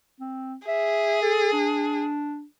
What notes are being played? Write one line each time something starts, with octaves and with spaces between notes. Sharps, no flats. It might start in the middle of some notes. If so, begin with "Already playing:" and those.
C4
G#4 E5
A4
D4